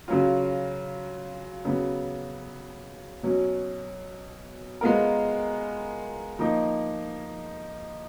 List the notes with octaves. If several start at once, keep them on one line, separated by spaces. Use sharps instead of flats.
C#3 F#3 C#4 F4
C#3 F#3 B3
B2 F#3 C#4
G#3 B3 F4 A#4
F3 A#3 D#4